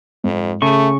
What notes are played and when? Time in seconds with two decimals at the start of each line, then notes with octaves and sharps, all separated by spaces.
0.24 F2 G#2
0.62 C#3 A3 G#4 C#6